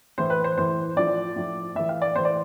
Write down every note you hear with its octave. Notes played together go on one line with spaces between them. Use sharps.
A2 E3 C5
B4
C5
A2 E3 C5
A2 F3 D5
A2 F3
A2 E3 E5
F5
D5
A2 E3 C5
D5